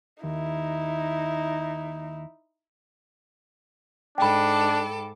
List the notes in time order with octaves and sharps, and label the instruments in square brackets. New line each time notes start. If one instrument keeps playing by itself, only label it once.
[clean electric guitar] D#2 [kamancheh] D#4 E4
[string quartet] G#2 A4 D6 [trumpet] D4 [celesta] G5 B5